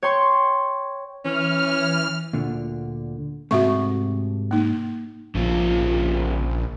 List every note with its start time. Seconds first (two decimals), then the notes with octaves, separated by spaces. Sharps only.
0.02 C#5 G5 C6 C#6
1.25 E3 C#4 F6
2.33 D2 A#2 D3
3.51 G#2 C3 A3 F#4 E5 C#6
4.51 A#3 D#4
5.35 A#1 C#3 F3 F4